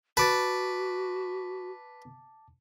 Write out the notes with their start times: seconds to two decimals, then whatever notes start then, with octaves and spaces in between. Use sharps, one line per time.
0.17 F#4 B4 A5 D6 A6